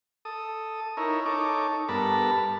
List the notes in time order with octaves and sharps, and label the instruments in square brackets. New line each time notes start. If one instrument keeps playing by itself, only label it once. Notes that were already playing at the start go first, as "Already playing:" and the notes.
[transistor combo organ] A4 D#6
D#4 E4 A#4 C#5
D#4 A4 C#5 D6
G2 B3 A4 A#4 A5 B5